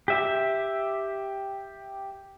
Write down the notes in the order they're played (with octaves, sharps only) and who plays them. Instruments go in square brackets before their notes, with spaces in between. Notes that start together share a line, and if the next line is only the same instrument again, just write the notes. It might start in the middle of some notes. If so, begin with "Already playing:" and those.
[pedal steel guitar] G4 E5